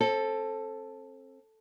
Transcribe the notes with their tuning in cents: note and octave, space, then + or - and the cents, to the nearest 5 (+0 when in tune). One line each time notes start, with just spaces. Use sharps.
C4 +30 A4 +0